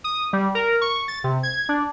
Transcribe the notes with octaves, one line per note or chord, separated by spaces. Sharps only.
D#6
G3
A#4
C#6
A6
C3
G#6
D4